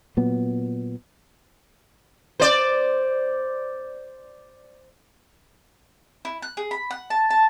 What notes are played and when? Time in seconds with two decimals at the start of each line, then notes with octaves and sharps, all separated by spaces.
0.17 A#2 F#3 B3
2.40 C5 D5
6.25 E4
6.42 F#6
6.57 G#4
6.71 B5
6.91 F#5
7.10 A5
7.31 A5